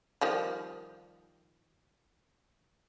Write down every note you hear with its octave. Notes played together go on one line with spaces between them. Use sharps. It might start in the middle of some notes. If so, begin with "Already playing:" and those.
D#3 F3 G3